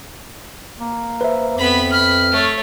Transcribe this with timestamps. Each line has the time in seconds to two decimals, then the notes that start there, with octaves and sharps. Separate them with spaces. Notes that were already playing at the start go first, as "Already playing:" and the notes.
0.79 A#3
1.21 B4 C5 E5
1.58 F2 B3 B5
1.92 B5 F6
2.32 A3 C#5